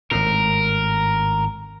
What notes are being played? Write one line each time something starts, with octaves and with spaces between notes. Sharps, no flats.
G#1 A2 A#4